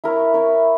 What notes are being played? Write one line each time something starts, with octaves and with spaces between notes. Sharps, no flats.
E4 A#4 C#5
E4 A#4 C#5